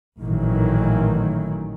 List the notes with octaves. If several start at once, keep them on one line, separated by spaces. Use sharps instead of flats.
A1 A#2 D#3 E3 F#3